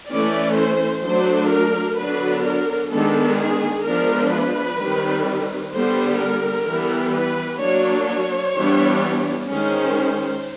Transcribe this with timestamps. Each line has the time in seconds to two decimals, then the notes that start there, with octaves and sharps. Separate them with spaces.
0.10 E3 A3 C#4 D5
0.57 C5
1.04 F#3 A3 D4 C5
1.51 A#4
1.99 D3 F#3 B3 D4 B4
2.45 A#4
2.92 D#3 G#3 B3 D4 A4
3.39 G#4
3.86 F3 G#3 B3 D4 A#4
4.32 B4
4.80 D#3 G3 C4
5.73 D3 G3 B3 C5
6.20 A#4
6.68 E3 G3 B3
7.14 B4
7.61 F#3 A#3 D4 C#5
8.08 C#5
8.55 E3 G3 B3 D4
9.48 D#3 G#3 C#4 C5